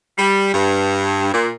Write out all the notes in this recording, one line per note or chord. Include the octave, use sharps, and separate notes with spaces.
G3
G2
A#2